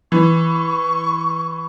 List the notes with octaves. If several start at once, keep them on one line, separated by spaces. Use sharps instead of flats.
E3 C#6